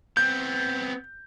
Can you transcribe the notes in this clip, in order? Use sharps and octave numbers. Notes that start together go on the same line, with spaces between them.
B3 C4 G6